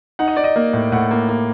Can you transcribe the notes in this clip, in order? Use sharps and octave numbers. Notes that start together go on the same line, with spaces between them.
D#4 F#5
D#5
D#4 D5
D#5
A#3
A2
A2 F#5
A#3
A#3